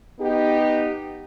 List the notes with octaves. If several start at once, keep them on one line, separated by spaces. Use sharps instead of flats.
B3 D#4 G4